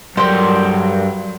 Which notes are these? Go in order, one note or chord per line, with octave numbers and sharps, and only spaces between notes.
G2 F#3 G4 A4 A#4 C5 D5 C6